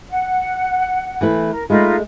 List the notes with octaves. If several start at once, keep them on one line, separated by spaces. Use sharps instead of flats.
F#5
E3 A3 B4
A#4
G#3 A3 D#4 F4 B5